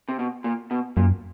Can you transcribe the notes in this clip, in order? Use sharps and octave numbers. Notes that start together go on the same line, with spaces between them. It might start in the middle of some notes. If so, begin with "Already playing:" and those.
C3
B2
A#2
B2
F#2 A#2